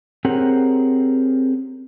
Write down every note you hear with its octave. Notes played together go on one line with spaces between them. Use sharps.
C4 G4 G#4 A#4 C#5 F#5